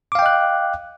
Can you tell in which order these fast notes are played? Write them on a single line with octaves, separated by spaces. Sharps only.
D6 F5 G5 D#5 F#6